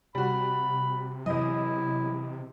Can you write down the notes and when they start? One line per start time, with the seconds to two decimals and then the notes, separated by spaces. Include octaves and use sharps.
0.15 C3 G3 F#4 B5
1.26 E2 F#3 E4 D#5